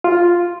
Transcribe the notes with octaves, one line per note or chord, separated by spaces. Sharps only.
F4